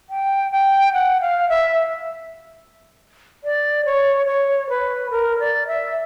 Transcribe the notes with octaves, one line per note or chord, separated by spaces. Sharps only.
G5
G5
F#5
F5
E5
D5
C#5
C#5
B4
A#4
D5
E5